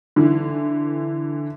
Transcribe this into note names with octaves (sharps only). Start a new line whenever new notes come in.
D3 E3